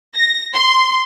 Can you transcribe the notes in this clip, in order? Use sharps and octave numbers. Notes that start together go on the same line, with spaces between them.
A#6
C6